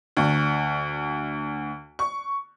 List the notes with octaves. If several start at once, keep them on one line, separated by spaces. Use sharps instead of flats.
D2
C#6